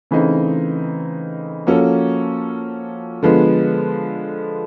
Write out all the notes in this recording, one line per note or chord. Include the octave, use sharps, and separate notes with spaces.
C#3 E3 A3 C4 D#4
F3 A#3 C#4 F#4 A4
D3 F3 G#3 B3